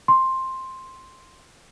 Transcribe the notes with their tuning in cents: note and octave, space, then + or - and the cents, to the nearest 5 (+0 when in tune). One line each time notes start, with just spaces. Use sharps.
C6 +5